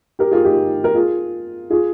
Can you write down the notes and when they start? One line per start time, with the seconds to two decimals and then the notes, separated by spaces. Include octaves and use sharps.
0.19 G4 A#4
0.31 F4 G#4
0.44 D#4 G4
0.84 A#4
0.95 F4 G#4
1.70 F4 G#4